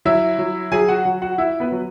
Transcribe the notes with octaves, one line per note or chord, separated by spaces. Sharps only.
F#3 E4 E5
F#3
F#3 G#4 G#5
F#4 F#5
F#3
F#4 F#5
E4 E5
B3 B4
F#3